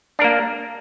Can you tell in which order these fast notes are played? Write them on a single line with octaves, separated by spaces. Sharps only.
D4 A#4 A#3